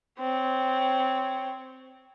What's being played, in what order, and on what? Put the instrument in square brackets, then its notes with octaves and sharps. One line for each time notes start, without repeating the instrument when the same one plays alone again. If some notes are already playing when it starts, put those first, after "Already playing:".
[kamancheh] C4 C#5